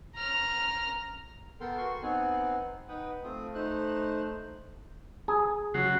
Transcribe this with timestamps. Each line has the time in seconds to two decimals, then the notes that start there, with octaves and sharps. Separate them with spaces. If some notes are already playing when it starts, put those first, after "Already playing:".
0.16 A#5 F6
1.60 B3 A4 A#4 G5 C6
1.78 F#4 C6 C#6
2.02 B3 C4 D#4 F#5 G#5
2.89 D#4 B4 F#5 G5 D#6
3.24 A3 C4 F4 D#6
3.54 A3 D#4 C5 F#6
5.28 G#4
5.74 C#3 F#3 F#4 C7